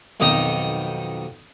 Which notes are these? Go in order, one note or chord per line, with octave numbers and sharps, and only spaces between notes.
B1 F2 D#3 D#4 D#5 A#5